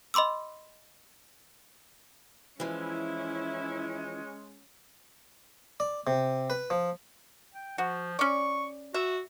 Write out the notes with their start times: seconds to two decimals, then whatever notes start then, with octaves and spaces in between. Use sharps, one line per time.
0.14 D#5 B5 C6 D6 E6
2.60 E3 F3 G#3 C#4 E4
5.80 D5
6.07 C3
6.50 B4
6.70 F3
7.54 G5
7.78 F3 F#4
8.19 C#4 D5 C#6
8.94 F#4 E5